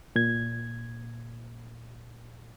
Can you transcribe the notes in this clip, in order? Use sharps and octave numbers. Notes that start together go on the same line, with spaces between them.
A#2 G#6